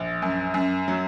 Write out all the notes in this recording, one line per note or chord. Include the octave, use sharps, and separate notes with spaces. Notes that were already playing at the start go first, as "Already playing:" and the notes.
Already playing: A#1
F#2
F#2
F#3